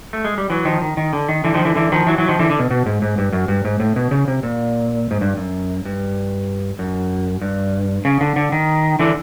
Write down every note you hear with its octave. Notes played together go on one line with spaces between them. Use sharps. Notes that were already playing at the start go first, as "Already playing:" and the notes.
A3
G#3
G3
E3 F#3
D#3 F3
D#3
D#3
D3
D#3
D3 E3
D#3 F3
D3 E3
D3 E3
D#3 F3
E3 F#3
E3 F#3
D#3 F3
D3 E3
D3
B2
B2
G#2
G#2
G2
F#2
G2
G#2
A2
B2
C#3
C3
A#2
G#2
G2
F#2
G2
F#2
G2
C#3
D3
D3
D#3
D3 E3